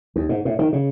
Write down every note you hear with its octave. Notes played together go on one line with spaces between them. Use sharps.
D#2
G#2
A2
D#3
C#3